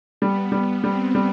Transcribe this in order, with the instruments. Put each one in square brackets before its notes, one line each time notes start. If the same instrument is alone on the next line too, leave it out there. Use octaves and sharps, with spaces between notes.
[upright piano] G3 [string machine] B3
[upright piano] G3 [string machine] B3
[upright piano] G3 [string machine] C4
[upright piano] G3